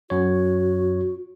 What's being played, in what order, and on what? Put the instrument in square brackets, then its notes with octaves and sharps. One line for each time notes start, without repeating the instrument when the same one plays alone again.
[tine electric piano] F#2 C#5 [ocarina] F#4